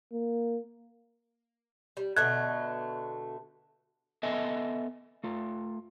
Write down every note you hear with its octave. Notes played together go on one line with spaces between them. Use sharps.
A#3
G3
B2 D3 A3 F#6 G#6
B3 A4 D#5 E5 G#5
A3 F4